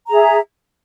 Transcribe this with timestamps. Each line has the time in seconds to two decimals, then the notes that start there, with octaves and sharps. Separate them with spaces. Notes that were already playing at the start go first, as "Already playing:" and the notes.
0.08 A#5
0.11 G#4
0.14 E5